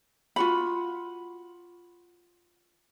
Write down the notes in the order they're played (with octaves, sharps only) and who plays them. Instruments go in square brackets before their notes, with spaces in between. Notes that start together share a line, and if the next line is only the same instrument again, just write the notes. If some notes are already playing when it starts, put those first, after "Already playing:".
[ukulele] F4 F#4 B5